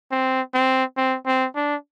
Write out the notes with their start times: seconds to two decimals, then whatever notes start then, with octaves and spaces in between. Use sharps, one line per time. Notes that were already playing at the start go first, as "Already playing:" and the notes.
0.11 C4
0.54 C4
0.97 C4
1.26 C4
1.55 D4